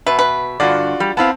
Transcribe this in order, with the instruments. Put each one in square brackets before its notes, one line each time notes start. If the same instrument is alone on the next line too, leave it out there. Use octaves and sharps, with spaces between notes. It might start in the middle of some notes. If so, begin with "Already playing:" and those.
[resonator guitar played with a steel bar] B2 [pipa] B4 [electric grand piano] E5
[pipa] B4
[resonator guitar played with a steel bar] G2 D3 [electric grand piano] F4 F#4 D5
[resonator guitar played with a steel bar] G3
[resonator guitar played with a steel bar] B3 E4 F5 [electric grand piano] C4 A5